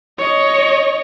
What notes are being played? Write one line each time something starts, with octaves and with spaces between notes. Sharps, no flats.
C#5 D#5